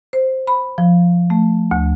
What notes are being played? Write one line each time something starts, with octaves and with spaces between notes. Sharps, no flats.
C5
B5
F3
A3
D2